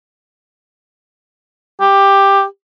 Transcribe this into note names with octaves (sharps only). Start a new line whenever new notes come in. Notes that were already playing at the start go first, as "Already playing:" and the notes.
G4